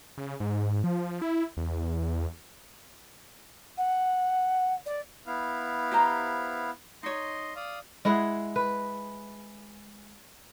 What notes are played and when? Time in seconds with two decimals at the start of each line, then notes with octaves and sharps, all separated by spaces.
0.18 C#3
0.40 G#2
0.84 F3
1.22 E4
1.57 E2
3.78 F#5
4.86 D5
5.26 B3 E4 F5
5.91 G4 C5 A#5
7.03 D#4 C#5 D#5 C6
7.56 D5 F5 D#6
8.05 G#3 E4 G#4 F#5
8.56 B4